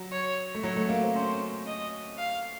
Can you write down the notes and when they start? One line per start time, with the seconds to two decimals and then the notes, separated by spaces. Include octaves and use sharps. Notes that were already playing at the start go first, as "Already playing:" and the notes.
Already playing: F#3
0.12 C#5
0.55 A3
0.64 F#3 C#5
0.77 A3
0.89 A#3
1.01 C4
1.15 C#4 C5
1.66 D#5
2.18 F5